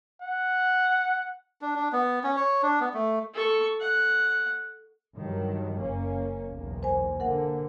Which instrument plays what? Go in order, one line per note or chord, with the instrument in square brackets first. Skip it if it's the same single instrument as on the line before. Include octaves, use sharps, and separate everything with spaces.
[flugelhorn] F#5
[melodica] D4
D4
B3
C#4
C#5
D4
B3
A3
[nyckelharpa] A4 C#6
F#5
[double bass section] G2 D#3 F#3
F#1 A#3 C#4
B1 E2 A#3
[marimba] C5 G#5
[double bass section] D3 A#3 [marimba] A#4 F#5